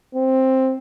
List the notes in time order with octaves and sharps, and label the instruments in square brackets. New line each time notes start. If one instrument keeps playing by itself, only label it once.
[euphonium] C4